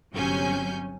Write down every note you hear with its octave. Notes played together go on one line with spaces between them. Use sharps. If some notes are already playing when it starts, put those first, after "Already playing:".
G1 C3 F#3 C#4 G#5 G6